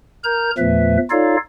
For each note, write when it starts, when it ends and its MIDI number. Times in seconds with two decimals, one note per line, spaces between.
0.24 0.50 70
0.24 0.50 82
0.24 0.50 91
0.58 0.97 40
0.58 0.97 46
0.58 0.97 53
0.58 0.97 57
0.58 0.97 71
0.58 0.97 76
1.11 1.37 63
1.11 1.37 65
1.11 1.37 69
1.11 1.37 73
1.11 1.37 74
1.11 1.37 77